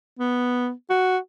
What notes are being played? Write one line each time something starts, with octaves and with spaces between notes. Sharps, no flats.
B3
F#4